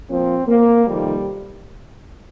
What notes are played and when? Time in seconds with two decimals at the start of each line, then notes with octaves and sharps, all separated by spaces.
0.09 A#2 F3 C4
0.47 A#3
0.87 F2 C3 D#3 G3